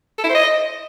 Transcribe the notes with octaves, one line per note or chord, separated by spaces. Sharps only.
A4
E4
C5
D#5